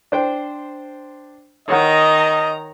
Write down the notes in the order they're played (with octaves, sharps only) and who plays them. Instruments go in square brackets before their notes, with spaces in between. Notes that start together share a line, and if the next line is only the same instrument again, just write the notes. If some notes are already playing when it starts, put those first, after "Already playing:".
[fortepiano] D4 C5 G5
[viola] D#3 A#5 [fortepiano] C#5 F#5 [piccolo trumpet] D#5